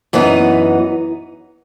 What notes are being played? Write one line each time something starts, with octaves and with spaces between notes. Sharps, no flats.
F#2 E3 B3 D#4